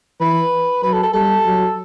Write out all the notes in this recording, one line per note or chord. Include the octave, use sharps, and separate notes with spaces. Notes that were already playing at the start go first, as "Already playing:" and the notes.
E3 B4
F#3 B4
A4
A4
G3 A4
F#3